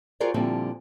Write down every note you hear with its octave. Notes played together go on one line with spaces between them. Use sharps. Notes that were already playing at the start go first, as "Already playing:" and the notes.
F4 F#4 G#4 A#4 C5 D5
A#2 D3 F3 G3 C4 E4